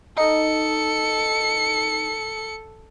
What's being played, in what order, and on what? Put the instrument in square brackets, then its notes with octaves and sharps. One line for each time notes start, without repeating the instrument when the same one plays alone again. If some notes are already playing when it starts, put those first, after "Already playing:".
[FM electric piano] D#4 D#5 [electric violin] A4 C#7